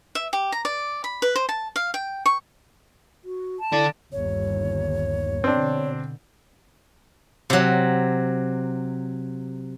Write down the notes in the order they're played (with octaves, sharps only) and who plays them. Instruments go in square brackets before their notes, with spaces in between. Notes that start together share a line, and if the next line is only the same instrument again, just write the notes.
[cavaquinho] E5
G4
A#5
D5
B5
B4
C5
A5
F5
G5
C#6
[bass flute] F#4
[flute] A5
[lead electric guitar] D3 A4 [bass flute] E4 [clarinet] D5
[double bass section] G1 D#2 [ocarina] C#5
[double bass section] B2 D3 [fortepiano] C4 D4
[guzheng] C3 F#3